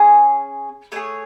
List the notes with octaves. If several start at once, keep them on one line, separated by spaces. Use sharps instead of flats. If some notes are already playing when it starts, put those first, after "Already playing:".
Already playing: C#4 G#4
A3 D4 G#4 C#5